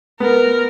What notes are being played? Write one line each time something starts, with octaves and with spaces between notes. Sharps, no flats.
B3 A#4